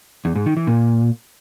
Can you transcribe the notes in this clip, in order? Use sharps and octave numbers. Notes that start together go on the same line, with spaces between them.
E2
G#2
D#3
E3
A#2